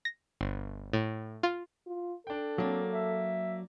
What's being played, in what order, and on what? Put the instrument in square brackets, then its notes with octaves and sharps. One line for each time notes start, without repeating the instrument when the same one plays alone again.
[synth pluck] A#6
G1
A2
F4
[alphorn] F4
[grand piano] D4 G5 [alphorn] A4
[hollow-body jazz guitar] F#3 D4 [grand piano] A#3 [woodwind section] C4
[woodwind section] E5